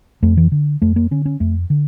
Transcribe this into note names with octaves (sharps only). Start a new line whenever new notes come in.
F2 A3
E3
D3
F2 A3
A#3
D3 C#4
C#4
F2 A3
D3